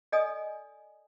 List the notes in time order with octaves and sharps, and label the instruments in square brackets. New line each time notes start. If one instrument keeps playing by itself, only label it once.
[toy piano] A4 D5 D#5 G#5 D#6